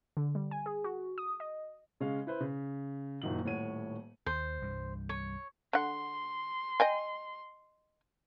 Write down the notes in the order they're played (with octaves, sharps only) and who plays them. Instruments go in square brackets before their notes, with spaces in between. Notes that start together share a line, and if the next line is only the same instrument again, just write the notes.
[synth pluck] D3
G3
G#5
G#4
F#4
D#6
D#5
[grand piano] C#3 G#3 C#4 F5
E4 B4 C5
C#3
F#1 A#2 D#3 F#4 F#7
D#1 A2 C#5 F#5 D#7
[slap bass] D#2 [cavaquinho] C5
[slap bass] C2 G2 G3
[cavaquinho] C#5
[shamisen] D3 F#5 [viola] C6
[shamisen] D#5 G5 G#5